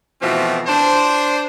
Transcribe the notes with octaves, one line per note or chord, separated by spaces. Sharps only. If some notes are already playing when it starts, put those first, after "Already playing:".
B2 E3 F3 A3 C4
D4 C5